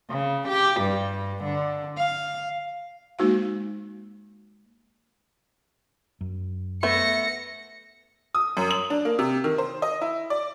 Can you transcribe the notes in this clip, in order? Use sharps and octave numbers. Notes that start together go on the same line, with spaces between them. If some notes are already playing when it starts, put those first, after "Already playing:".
C#3
G4
G2
D3
F5
G#3 A#3 D#4 F#4 C5 F5
F#2
A3 B3 E5 A#6 C#7
D#6
F#2
F#7
D4
A#3
C3
D#3
C5
D#5
E4
D5